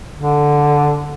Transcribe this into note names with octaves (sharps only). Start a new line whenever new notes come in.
D3